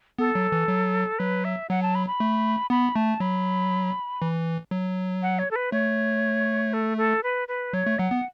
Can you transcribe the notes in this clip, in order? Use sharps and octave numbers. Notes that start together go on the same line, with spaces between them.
B3 A4
F#3
E3
F#3
F#3 B4
E5
F#3 F#5
A5
B5
B5
A3
B3 B5
A3 A5
F#3 B5
E3
F#3
F#5
C#5
A4
B4
A3 C#5
A4
A4
B4
B4
F#3 C#5
A3
F#3 F#5
B3